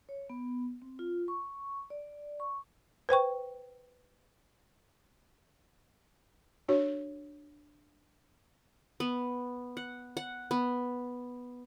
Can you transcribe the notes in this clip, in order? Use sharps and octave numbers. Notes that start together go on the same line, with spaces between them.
C#5
B3
C4
F4
C#6
D5
C#6
B4 C5 G5 C#6
D4 F#4 C#5
B3
F#5
F#5
B3